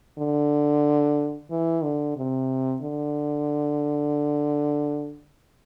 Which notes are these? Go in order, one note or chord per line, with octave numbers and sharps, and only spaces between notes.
D3
E3
D3
C3
D3